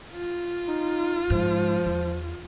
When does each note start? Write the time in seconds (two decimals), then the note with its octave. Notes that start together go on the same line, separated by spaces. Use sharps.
0.11 F4
0.68 D#4
1.30 G#2 F3
1.86 E2